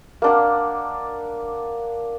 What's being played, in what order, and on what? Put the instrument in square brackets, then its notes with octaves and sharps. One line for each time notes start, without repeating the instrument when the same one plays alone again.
[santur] A#3 D4 F#5